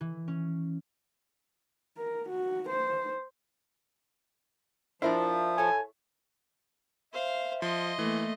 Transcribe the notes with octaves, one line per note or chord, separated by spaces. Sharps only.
E3
C#4
A#4
F#4
C5
F3 D4 E4 A#4 C5
A4 C#5 G#5
C5 E5 F5
F3 D#5 C6
E3 A3 A#3